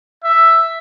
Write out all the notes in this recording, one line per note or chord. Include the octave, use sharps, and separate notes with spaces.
E5